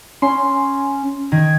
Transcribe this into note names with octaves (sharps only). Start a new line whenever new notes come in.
C#4 C6
D#3 G#6